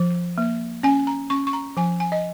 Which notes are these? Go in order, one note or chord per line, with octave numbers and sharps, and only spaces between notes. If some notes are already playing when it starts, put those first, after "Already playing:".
Already playing: F3
A#3
C#4 G#5
A#5
C#4 C#6
C#6
A#5
F3 G#5
G#5
D#5